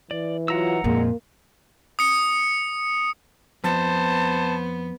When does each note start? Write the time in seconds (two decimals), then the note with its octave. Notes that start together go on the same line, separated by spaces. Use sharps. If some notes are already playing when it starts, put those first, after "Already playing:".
0.11 E3 D5
0.48 F#3 F4 F#5 A#5 E6
0.84 F2 A#2 G#3 A#3
1.99 D#6 C#7
3.64 F2 B3 C5 A5